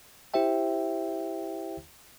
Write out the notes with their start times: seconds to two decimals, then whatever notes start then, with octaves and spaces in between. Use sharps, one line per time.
0.34 E4 G4 C5 E5 G5